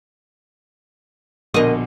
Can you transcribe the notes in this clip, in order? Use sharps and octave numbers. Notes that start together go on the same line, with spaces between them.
A#1 B2 D3 A#4 D#5